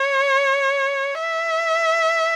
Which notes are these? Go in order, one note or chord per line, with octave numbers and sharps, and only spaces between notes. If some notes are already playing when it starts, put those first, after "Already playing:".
Already playing: C#5
E5